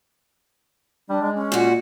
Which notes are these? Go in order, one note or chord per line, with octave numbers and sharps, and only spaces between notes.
G3 D4
G#3
C#4
A#2 F#4